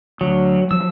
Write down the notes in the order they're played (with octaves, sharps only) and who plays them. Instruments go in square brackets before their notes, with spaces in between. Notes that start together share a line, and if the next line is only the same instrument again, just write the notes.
[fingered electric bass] D2 [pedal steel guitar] F#3
[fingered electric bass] F3 F#3 [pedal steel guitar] E6